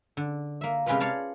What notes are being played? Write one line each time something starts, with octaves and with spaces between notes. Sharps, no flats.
D3
A#3 E5
C3 G#3 C#4 F4 A#4 B4
C#5 D5 F5 A5